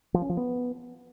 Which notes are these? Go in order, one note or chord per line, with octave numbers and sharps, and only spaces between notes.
F3
C#4
F3
B3